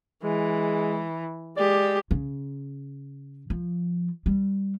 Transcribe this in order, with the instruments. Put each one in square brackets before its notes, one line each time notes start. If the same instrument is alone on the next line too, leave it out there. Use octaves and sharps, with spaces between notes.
[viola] E3 [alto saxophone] G#3
[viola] G#3 G4 [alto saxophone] D5
[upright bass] C#3
F3
G3